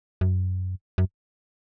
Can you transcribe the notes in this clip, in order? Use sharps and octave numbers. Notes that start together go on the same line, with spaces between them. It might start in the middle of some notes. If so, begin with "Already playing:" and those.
F#2
F#2